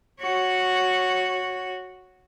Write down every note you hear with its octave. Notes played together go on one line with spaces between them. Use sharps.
F#4 C#5